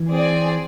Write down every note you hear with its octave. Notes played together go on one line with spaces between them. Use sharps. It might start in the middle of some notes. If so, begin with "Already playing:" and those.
Already playing: E3
C4 G#4 D5